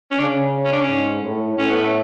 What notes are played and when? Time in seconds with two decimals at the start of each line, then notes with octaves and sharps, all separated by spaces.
0.11 C#4
0.19 C#3 D4
0.64 C#4
0.73 D4
0.81 C#4
0.89 G#2
1.23 A2
1.57 A2 C#4
1.70 B3
1.83 A3